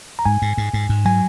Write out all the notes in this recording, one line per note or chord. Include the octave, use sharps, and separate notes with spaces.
A#5
G#2 G#5
G#2
G#2
G#2
G#2
F#3 G#5